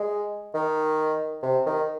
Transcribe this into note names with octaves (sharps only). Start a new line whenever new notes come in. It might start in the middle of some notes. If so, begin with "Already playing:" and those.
Already playing: G#3
D#3
C3
D#3